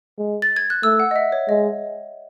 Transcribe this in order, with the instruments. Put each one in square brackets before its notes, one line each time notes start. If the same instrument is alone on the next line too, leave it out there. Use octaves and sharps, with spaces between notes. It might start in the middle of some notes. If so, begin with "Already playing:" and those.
[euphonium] G#3
[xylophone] A6
G#6
F#6
[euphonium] A3 [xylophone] E6
[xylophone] F#5
D#5
E5
C#5
[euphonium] G#3 [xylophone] D#5